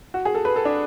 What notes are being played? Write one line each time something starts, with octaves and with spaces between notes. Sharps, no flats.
F#4
G#4
A4
B4
A4
D4